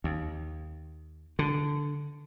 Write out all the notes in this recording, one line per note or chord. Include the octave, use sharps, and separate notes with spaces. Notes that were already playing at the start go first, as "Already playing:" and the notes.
D#2
D3